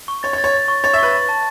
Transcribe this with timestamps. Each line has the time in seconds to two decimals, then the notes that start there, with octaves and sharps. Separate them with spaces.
0.08 C#6
0.23 C#5 A6
0.33 C#5
0.38 A6
0.44 C#5
0.54 A6
0.68 C#6
0.84 C#5 A6
0.93 E5
0.98 B4 C#6
1.13 A6
1.29 A5